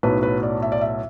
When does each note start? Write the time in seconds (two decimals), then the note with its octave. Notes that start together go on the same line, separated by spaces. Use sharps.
0.03 B1 A2 F#3 B3 B4
0.23 B4
0.43 D5
0.62 E5
0.72 D5
0.81 E5